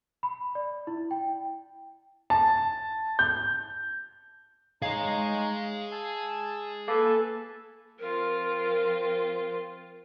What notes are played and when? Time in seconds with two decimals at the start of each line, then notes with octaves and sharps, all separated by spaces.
0.23 B5
0.55 D5
0.87 E4
1.11 G5
2.30 A5
3.19 G6
4.82 D#4 G#4 C#5 D#5 F5 G#5
5.92 G#5 A5 E6
6.88 A#3 A4 B4 G#5 A5
8.00 F3 C4 F4 A#4